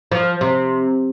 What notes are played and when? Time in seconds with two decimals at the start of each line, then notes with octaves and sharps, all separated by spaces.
0.12 F3
0.41 C3